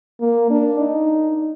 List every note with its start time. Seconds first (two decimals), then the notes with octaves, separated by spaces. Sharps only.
0.21 A#3
0.50 D4
0.80 D#4